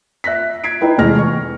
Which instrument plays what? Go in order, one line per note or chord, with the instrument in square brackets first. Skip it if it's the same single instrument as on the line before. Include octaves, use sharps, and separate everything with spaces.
[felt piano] E5 F#6 A#6 B6
G#6 B6 C7 D7
D#4 E4 B4 G5
F1 E2 G#3 F6 A#6
C#6